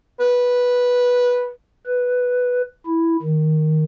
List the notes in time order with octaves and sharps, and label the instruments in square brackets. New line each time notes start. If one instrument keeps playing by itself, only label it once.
[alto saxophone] B4
[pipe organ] B4
E4
D#3